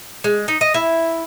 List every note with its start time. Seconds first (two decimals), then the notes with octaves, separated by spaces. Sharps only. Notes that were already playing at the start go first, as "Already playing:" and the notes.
0.24 G#3
0.48 D#4
0.61 D#5
0.74 E4